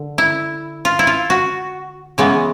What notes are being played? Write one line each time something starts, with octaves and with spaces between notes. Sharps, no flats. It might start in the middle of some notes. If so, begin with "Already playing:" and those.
Already playing: D3
E4
F4
E4
F4
F#4
C#3 E3 G#3 B3